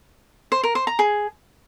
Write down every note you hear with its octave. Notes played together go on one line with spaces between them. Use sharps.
C5
A#4
C5
A#5
G#4